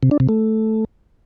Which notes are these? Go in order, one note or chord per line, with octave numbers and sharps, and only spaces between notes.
C3
D4
C3
A3